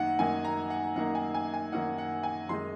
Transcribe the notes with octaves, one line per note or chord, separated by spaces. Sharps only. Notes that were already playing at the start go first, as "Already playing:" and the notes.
Already playing: F#2 D#3 A#3 D#4 F#5
F#2 D#3 A#3 D#4 G#5
A#5
F#5
F#2 D#3 A#3 D#4 F#5
G#5
G#5
G#5
F#2 D#3 A#3 D#4 F#5
F#5
G#5
F#2 D#3 G#3 D#4 C6